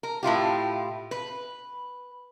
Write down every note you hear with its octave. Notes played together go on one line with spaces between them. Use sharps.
A#4
A2 E4 F4 G4
B4